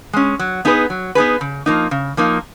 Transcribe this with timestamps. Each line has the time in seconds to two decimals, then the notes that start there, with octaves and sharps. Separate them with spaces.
0.13 G#3 C#4
0.39 F#3
0.65 B3 D#4 G#4 B4
0.90 F#3
1.15 B3 D#4 G#4 B4
1.41 C#3
1.66 F3 A#3 D#4
1.91 C#3
2.17 F3 A#3 D#4